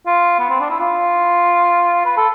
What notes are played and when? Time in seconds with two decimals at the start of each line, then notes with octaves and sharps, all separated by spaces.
0.06 F4
0.39 B3
0.50 C4
0.60 D4
0.70 E4
0.80 F4
2.05 B4
2.17 A4